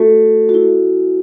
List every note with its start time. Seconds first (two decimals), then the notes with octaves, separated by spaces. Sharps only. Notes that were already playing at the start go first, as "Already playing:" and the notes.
Already playing: A3 F#4
0.49 F#4
0.54 E4